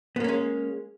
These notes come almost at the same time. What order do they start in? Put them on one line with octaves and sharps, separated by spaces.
B3 A#3 C#4 G#3